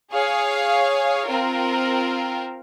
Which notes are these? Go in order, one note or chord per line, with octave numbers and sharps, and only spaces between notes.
G#4 C#5 F5
C4 F4 A#4